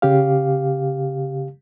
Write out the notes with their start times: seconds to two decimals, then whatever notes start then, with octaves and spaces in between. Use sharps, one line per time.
0.02 C#3 G4 F5